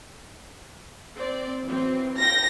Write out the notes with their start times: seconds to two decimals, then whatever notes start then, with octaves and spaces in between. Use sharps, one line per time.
1.16 C4 D5
1.65 E3 F#3 C4
2.18 F4 G5 A#6